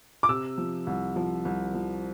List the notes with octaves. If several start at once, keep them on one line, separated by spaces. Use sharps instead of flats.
D6
C3 E6
F3
C2
F3
C2
F3